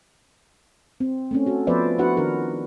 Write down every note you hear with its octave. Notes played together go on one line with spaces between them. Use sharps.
C4
A3 C4 C#4
F#4 A4
F3 B3 B4 C5 D5 E5
D4 E4 F#4 B4 F#5
D#3 D4 A#4